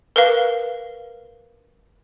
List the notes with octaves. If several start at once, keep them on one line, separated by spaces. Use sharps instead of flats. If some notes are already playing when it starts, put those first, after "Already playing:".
A#4 B4 F5